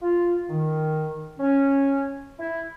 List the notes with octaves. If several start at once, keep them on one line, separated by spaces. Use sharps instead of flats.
F4
D#3
C#4
E4